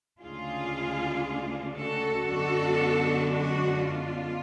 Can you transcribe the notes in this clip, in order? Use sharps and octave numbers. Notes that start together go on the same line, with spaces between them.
D2 C#3 G#3 D4 F4 G#4
F#4 A4
F#2 D3 G#3 B3 D4 F#4 A4
F#4
F4